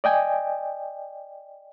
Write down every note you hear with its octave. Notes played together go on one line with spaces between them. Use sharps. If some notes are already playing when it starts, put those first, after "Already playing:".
D5 D#5 G5 G#5